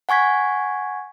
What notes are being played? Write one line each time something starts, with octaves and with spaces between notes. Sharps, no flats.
F#5 G#5 C#6 G#6 B6